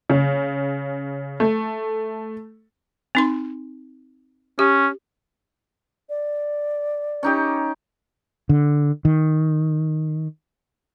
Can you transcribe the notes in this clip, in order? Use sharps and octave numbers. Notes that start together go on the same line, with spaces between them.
C#3
A3
C4 D#4 C6
C#4 G4
D5
C#4 D#4 G4
D3
D#3